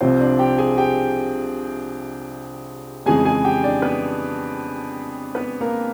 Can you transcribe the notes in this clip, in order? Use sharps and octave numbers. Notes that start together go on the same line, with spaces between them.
C2 C3 F3 C4 C5
D4 D5
G4 G5
G#4 G#5
G4 G5
F2 C#3 E3 G#3 G#4 G#5
G#4 G#5
G4 G5
D4 D5
B3 B4
B3 B4
A#3 A#4